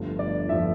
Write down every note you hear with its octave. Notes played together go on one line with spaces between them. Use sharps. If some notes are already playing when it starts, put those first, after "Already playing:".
Already playing: G1 G2 F3 A3
D5
G1 F3 A3 E5